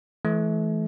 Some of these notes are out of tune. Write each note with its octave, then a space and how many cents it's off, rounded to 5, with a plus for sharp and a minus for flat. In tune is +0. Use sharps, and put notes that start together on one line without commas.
E3 +0 A3 -35